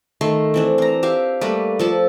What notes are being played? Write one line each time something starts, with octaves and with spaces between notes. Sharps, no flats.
D#3 A3 C6
E3 C4 D4
C4 A#5
G4 E5 F5
G3 A3 A#3 B4
F3 A4 A5